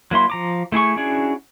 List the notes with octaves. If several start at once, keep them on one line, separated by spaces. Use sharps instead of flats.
F#3 A#3 E4 C6
F3 A#5 D6
A3 E4 G#4 C#6
C#4 D4 E4 F#4 G#4